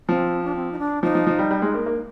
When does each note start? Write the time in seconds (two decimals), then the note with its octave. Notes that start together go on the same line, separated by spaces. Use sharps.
0.08 F3 C4
0.44 D4
0.55 C4
0.72 D#4
0.79 D4
1.03 F3 D#4
1.15 F3
1.27 F3
1.39 G3
1.51 G3
1.62 G#3
1.74 A#3
1.86 A#3